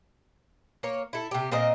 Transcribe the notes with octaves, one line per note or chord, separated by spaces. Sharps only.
A#3 A#4 C#5
E4 A4
C3 G4
A#2 C4 A#4 D#5